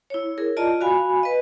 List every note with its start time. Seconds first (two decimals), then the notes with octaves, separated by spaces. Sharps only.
0.10 E4 C#5
0.38 G#4 A#4
0.57 F4 D5 D#5 A5 A#5
0.81 F#4 F5 G#5 B5
1.23 B4 D#5